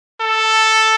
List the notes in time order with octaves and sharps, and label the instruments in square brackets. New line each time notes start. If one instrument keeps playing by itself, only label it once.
[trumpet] A4